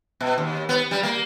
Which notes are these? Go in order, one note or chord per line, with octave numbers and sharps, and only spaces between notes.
B2
D#2
B3
G3
A#3